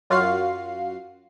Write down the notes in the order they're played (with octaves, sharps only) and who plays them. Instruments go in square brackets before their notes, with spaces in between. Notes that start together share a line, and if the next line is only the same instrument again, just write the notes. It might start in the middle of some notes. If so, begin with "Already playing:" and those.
[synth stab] F#2 F4 F#4 F5 C7